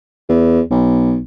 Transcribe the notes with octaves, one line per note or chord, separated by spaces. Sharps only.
E2
B1